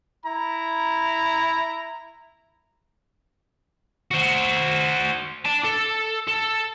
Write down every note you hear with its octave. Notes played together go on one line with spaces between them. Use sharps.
E4 A#5
F#4 C5
D5 A5
A4
A4